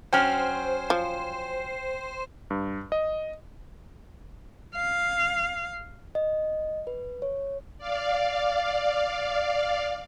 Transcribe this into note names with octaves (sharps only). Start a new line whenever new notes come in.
F#3 C#4 C5 G5 F6
F3
G2
D#5
F5
D#5
B4
C#5
D5 F5